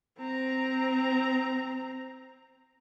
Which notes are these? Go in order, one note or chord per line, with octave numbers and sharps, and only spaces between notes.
C4 A#5